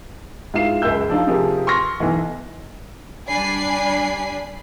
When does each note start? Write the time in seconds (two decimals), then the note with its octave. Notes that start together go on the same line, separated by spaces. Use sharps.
0.54 G#2 E4 F4 F5 C7 E7
0.82 C#2 F#2 E5 E6 G6
1.10 F3 D4 D#4 F4
1.27 C3 F3 G4 G#4 A#4
1.67 C6 C#6 F6 A#6
2.00 B1 E3
3.28 G3 D4 D5 G#5 B5 C7